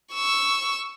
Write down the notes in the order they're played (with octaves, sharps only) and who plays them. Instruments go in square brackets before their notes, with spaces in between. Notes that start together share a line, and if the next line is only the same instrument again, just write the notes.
[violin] C#6 E6